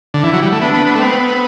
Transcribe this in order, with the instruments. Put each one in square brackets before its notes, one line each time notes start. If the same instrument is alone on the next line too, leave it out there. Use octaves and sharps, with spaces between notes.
[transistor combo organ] D3
[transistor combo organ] E3 [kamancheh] E4
[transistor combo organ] F#3
G3
A3
[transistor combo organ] B3 [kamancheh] D4
[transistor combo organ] B3
B3
A3
[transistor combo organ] B3 [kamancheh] C4